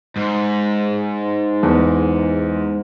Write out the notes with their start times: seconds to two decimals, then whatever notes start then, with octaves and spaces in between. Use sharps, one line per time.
0.16 G#2
1.63 E2